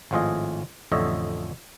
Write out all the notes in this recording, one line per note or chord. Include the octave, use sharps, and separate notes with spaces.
G#1 A2 F3 F4 G#4 D#5
A1 F2 D3 C#5 D#5 E5